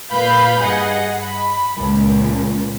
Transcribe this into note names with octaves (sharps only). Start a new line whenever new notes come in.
A#2 B4 F5 B5 G6
G2 G#4 D#5 F#5
B5
C#2 A#2